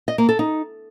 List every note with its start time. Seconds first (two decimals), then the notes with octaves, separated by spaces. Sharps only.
0.08 D#5
0.18 A#3
0.29 A4
0.39 D#4